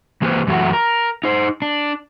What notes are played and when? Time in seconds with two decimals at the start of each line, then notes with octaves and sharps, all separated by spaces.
0.22 E3 A#3 G4 B4 C5
0.47 F#2 E3 F#3 A3 F#4
0.73 A#4
1.24 D#4 C5
1.62 D4